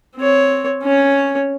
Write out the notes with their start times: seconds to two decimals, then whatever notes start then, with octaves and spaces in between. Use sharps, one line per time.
0.16 C4 C#5
0.83 C#4 C#5